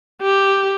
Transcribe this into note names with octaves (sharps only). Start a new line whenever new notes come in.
G4